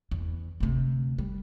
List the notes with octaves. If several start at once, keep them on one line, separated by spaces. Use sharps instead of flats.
E2
D2 C3
G3